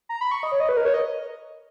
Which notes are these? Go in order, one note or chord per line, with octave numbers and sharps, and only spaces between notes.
A#5
B5
C#6
D#5
C#5
D#5
B4
A#4
C#5
D#5